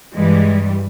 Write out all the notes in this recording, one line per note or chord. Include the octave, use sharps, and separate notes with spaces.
G2 E3 G3 G#3